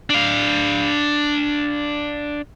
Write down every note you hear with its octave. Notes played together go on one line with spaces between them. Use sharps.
D4 F5